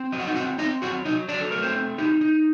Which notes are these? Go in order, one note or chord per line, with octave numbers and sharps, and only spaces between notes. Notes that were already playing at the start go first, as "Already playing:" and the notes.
Already playing: C4
F#3 D#5
F#5
D#4 D#5
C4 F#4 F#5
C4 D#4 D#5
F#3 F#4 F#5
F#3 D#4 D#5
F#3 D4 D5
A4
A3 A#4
C4 C5
C4
D#4 G4
D#4